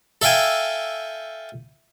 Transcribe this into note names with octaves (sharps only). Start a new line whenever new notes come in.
A4 E5 F5 G5 G#5